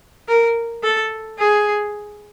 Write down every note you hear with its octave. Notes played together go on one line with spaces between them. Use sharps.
A#4
A4
G#4